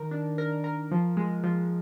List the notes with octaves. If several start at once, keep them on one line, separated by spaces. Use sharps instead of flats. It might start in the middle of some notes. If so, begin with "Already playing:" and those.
Already playing: D#3 A#4
D4
A#4
A#4
F3
G#3
F3